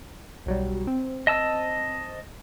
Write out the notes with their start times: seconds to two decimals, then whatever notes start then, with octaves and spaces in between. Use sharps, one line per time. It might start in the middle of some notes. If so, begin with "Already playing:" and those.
0.46 B1 F#3 G3
0.87 C4
1.27 D#5 A5 E6